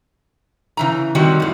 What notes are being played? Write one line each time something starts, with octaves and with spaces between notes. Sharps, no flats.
C#3 E3 A#5
D#3 F#3 G3 C4 F#4
F#2 A2